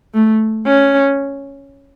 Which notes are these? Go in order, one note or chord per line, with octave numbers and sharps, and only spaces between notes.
A3
C#4